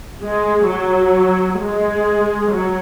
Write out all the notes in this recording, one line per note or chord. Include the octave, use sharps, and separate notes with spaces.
G#3
F#3
G#3
F#3